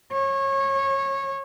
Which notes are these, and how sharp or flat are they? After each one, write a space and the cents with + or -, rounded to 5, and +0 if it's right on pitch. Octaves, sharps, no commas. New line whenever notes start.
C#5 -25